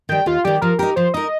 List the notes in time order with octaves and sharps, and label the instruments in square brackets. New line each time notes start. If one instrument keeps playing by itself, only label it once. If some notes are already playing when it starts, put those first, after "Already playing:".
[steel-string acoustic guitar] D#3 G3 [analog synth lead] G5
[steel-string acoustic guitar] D#2 [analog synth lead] F4
[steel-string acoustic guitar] D#3 G3 [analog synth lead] G4
[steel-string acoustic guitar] F3 [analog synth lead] A#4
[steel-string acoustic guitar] D#4 A#4 [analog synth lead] G4
[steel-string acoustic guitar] F3 [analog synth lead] C5
[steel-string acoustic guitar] D#4 A#4 [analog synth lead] D#5